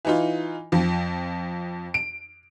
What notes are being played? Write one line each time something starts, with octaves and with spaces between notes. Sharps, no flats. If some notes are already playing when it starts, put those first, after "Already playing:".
E3 D#4 F4
F2 F3
D7